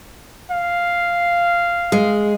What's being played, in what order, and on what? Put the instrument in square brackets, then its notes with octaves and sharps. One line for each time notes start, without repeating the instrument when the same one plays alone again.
[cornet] F5
[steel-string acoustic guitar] G#3